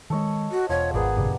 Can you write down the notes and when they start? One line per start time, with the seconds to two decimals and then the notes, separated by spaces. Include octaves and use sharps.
0.10 D#3 G#3 A4 C#5 D#5
0.51 F#4
0.69 E1 F3 C#5 F#5 C#6
0.94 G#1 B3 G#4 A#4 D5
1.17 F#2 A#2 C#3 G3